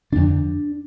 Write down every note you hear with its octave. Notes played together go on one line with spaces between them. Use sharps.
F2 D3 D4